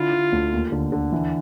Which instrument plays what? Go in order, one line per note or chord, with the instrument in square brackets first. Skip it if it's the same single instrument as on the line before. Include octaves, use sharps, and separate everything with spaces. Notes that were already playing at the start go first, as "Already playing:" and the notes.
Already playing: [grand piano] D3 E4 [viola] F4
[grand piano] D3
D2
D#2
D3
D3
E3